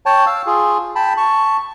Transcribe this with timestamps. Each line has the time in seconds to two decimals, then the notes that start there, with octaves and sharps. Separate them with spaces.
0.06 C#5 G5 A5
0.27 F5 E6
0.46 F4 G#4
0.95 G5 A5 B5
1.17 A5 C#6